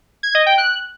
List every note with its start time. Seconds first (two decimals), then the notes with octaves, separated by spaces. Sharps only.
0.23 G#6
0.35 D#5
0.46 G5
0.58 F#6